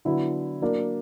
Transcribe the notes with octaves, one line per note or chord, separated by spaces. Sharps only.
D3 F#3 B3 E4
F#3 A#3 D4